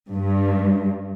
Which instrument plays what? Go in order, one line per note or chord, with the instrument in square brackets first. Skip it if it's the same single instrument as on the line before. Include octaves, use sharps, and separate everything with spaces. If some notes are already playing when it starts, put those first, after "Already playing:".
[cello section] G2